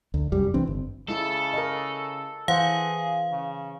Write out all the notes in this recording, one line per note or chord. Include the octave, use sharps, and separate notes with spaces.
D2
C2 F#2 G3
C2 E3 C4 D4
G1
C#3 G#3 E4 A4
A#4 D#5
E3 G#4 C5 F5 F#5
C#3